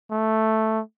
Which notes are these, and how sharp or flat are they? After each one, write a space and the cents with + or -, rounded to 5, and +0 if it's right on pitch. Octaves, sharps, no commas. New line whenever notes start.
A3 +0